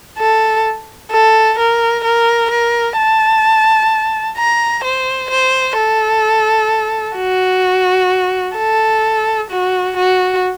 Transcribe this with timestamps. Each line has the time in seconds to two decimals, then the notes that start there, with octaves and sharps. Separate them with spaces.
0.18 A4
1.11 A4
1.58 A#4
2.04 A#4
2.51 A#4
2.98 A5
4.37 A#5
4.84 C5
5.31 C5
5.77 A4
7.17 F#4
8.57 A4
9.51 F#4
9.97 F#4